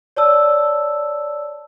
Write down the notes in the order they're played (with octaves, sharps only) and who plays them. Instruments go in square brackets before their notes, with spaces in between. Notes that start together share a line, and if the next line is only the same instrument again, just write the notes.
[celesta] C#5 D5 A5 E6